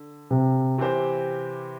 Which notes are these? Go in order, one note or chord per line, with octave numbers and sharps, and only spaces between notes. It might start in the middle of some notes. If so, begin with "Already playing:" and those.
Already playing: D3
C3
C3 E3 C4 G4 C5